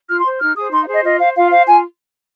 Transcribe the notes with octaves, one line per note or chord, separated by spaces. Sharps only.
F4 F6
C6
C5
D#4 F6
G#4 C5 D#6
D#4 C6
F5
G#4 C5
D#5
F4 D#5
C5 F5
F4 F5
C5 F5
F4 G#5